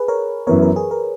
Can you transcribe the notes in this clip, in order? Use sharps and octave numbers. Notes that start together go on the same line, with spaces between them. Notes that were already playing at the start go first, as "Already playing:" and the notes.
Already playing: G#4 B4
A#4 C#5
F#2 E3 B3 A#4 C#5
A#4
G#4
A#4